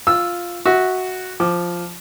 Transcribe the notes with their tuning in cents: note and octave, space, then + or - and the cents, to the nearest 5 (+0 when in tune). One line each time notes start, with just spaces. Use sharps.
F4 +0 E6 +0
F#4 +0 E5 -30
F3 +0 D6 +10